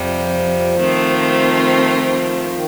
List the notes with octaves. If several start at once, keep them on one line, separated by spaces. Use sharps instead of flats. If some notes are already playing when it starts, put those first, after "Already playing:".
Already playing: F2 C3 F3 G3
D#3 A3 C4 F4
D#3